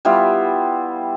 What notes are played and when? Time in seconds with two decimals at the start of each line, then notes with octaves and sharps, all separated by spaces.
0.05 G3 B3 E4 F4